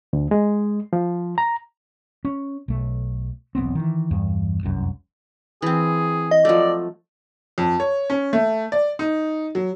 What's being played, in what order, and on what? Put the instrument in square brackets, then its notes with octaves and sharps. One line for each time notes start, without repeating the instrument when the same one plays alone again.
[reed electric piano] D2
G#3
F3
A#5
[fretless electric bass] C#4
B1 A3
E1 B1 B3 C4
D#3 E3
E2 G2
F1 C2 F#2
[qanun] E3 C4 [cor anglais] G#4
[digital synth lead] D#5
[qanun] F3 F#3 A3 [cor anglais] D5
[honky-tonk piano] F2
C#5
C#4
A3
D5
D#4
F#3